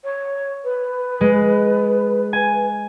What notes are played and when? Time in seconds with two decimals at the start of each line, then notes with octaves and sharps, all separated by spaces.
0.04 C#5
0.64 B4
1.21 G#3
2.33 G#5